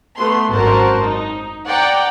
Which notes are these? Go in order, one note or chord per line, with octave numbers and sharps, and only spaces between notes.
A3 B3 C6
G#1 F#2 F#4 A#4 C5 A5
D#4
D5 F#5 G5 A#5